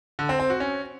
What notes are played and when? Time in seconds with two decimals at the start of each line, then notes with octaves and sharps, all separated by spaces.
0.19 D3
0.29 C4
0.40 C4
0.50 F#4
0.60 C#4